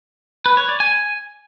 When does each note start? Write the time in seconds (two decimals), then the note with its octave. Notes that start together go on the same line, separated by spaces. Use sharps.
0.46 B4
0.57 C#5
0.69 D5
0.80 G#5